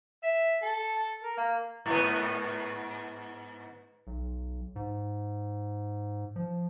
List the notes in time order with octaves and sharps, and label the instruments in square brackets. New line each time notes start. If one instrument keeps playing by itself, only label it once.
[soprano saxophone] E5
A4
A#4
A#3
[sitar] G#2 B3
[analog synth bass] B1
G#2
F3